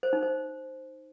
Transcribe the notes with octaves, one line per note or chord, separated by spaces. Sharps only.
C5
D#4
C5